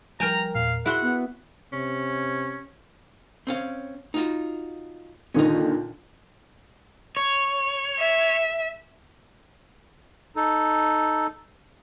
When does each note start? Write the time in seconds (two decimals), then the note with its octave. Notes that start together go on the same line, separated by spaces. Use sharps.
0.20 F3 G3 A#4 G5 G#5 A#5
0.55 E2 A#2 F5
0.86 E4 F#4 G#4 F#5 C6
1.02 B3
1.73 C3 C#4
3.47 C4 C#4 F5
4.14 D#4 F4 F#4
5.34 A#2 D3 D#3 C#4 D#4
7.17 C#5
7.98 E5
10.36 D#4 A4